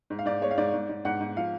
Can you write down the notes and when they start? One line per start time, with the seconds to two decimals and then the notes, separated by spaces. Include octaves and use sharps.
0.10 G#2
0.19 F5
0.25 G#2 D5
0.42 G#3 C#5
0.51 F5
0.58 G#2 D5
0.73 G#2
0.89 G#2
1.05 G#2 F#5
1.20 G#2
1.37 F3 F5